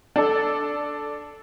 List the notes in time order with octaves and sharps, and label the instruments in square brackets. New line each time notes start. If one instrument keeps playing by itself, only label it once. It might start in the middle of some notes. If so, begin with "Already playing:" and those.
[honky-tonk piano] D4 A4